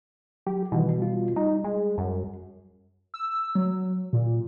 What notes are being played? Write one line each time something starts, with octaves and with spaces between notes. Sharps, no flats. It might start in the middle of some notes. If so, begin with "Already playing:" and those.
F#3 G4
B2 D#3 E3 G3
G3 F4
G3 D#4
G#3
F#2
E6
F#3
A#2